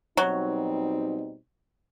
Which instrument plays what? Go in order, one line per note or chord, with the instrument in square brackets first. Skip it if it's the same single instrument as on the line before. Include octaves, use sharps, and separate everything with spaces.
[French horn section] B2 G3 C4 D#4 [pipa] F#3